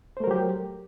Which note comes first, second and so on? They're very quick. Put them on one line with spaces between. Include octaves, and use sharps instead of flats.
C5 A3 A#4 F#3 G4